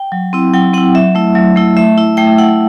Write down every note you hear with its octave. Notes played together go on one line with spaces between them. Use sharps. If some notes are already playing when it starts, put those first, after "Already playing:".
Already playing: G5
F#3
C4 E4
F#3 G5
C4 E4 F#5
F#3 E5
A3 E4
F#3
A3 E4
A3 E5
E4
A3 G5
E4 F#5